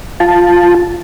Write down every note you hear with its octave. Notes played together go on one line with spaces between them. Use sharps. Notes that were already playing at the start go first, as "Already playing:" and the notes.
F4 A5